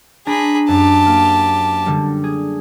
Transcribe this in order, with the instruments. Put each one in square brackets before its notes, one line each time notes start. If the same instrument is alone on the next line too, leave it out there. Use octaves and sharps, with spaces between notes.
[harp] D4 A#5 A#6 [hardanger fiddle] G#4 B5
[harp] F#2 [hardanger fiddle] G4 A5
[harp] A#3
D3 G3
G#4